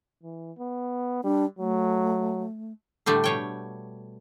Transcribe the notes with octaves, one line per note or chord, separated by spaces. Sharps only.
E3
B3
G3 D4
F#3 A3
A2 D3 G3 A3
B2 C#5 G5